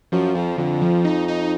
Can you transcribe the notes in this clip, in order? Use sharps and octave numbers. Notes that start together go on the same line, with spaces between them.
F#2 F3
F2 F3
F2 D3
F3
D#4
D#4